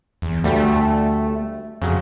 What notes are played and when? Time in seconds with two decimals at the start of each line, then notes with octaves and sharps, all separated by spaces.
0.22 E2
0.44 D2 G3 A3
1.82 F2 C#3 F#3